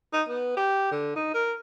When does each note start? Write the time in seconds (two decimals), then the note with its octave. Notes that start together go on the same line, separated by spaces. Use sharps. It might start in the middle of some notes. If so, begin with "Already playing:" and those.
0.13 D#4
0.28 B3
0.57 G4
0.91 D3
1.16 D#4
1.34 A#4